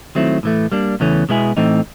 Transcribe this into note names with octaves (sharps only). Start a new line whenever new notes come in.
D#3 F#3 A3 C4 E4
A2 E3 A3
G3 A#3 D4
E2 C#3 E3 A3 C#4
B2 G#3 B3 E4 G#4
A2 E3 A3 C4 D#4